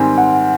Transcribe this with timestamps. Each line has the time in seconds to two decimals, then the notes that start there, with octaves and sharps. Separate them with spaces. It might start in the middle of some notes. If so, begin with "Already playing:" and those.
Already playing: G#2 D#3 G3 C4 G#5
0.18 F#5